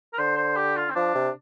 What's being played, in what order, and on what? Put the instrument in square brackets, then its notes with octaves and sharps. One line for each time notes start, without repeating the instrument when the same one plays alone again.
[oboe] A#4
[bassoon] D3 [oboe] C5
[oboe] C5
G4
F4
C4
[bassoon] F3 [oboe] D4
[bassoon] C3